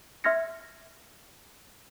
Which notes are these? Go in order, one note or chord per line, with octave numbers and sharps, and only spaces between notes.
E5 C6 F6 G#6 A#6 C#7